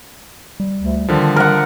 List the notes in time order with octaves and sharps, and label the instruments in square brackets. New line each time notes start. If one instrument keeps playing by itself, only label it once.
[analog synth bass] G3
[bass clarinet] D2
[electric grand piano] D3 F3 [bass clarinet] D#3
[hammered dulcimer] A#4 F#5